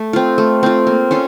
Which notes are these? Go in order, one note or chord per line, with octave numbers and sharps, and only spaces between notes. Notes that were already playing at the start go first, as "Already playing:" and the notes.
Already playing: A3
C4 F4
A3
C4 F4
A#3
C#4 F4 A4